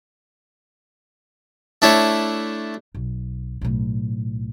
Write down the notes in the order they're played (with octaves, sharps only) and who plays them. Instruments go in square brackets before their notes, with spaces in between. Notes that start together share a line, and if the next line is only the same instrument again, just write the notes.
[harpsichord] A3 D4 E4 C#5
[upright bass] B1
B1 A2